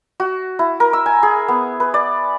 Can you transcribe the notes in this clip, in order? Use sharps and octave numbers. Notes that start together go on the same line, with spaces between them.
F#4
E4
A#4
E6
G#5
G#4
B3
B4
D5